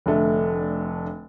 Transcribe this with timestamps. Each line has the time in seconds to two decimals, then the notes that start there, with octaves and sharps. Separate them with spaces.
0.06 F1 D3 A3